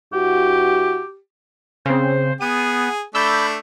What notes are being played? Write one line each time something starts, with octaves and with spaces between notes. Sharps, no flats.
G2 E4 F#4 G4
C#3 C4 C5
B3 G#4 D#7
A3 D4 B5 E6 G6